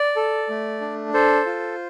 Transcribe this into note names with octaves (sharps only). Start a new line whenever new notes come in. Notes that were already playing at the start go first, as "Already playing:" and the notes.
Already playing: D5
A4
A3
D4
A4 C5
F4